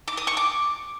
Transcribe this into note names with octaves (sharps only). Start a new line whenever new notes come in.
D6
D#6
C#6
D6